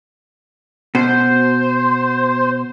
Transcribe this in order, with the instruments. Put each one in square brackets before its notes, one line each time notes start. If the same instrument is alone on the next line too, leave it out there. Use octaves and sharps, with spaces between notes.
[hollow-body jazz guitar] B2 [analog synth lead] C5